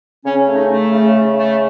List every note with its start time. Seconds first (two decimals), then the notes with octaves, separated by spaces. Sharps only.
0.24 C#3 C#4
0.47 A3
0.55 D#4
0.70 A3
0.92 C#3
1.15 C#3
1.37 A3